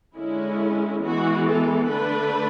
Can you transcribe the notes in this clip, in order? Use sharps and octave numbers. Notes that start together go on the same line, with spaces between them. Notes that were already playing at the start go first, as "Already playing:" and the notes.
D3 G#3 C#4 E4
E3 G#3 B3 F#4
A4
D3 A3 D4 B4